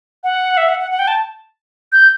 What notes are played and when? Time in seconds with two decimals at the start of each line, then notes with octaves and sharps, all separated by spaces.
0.24 F#5
0.57 E5
0.69 F#5
0.80 F#5
0.91 F#5
0.99 G5
1.08 A5
1.93 G6